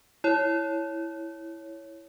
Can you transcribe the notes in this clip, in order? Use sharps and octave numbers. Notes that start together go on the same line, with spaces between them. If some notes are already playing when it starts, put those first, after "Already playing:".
E4 C#5